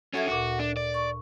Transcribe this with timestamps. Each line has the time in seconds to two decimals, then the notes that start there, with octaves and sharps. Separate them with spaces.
0.14 C#4 F#4 A4 E5 G#6
0.28 D2 A#2 F#4
0.59 D4
0.77 D5
0.94 C#6